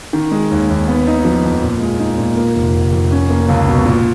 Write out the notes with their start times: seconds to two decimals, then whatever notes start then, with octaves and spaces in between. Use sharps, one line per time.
0.13 D#3
0.32 G#3
0.51 D#2
0.70 D#2
0.88 B3
1.07 D#4
1.25 F3
1.44 F2
1.62 A#2
1.81 G#3
1.99 D#4
2.18 A#2
2.37 A#3
2.56 F1
2.74 F1
2.92 F1
3.12 C#4
3.30 A#3
3.49 C#2
3.68 B2
3.86 A#2